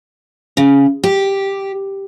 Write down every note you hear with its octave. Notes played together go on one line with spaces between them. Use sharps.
C#3
G4